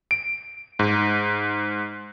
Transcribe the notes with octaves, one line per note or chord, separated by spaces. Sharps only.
D7
G#2